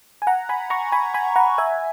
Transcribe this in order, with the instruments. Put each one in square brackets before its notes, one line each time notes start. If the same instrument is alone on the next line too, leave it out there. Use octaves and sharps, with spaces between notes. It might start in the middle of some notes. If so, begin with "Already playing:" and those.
[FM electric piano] G#5
F#5 A#5
G#5 B5
A#5 C#6
G#5 B5
G#5 B5
F#5 A#5
E5 G#5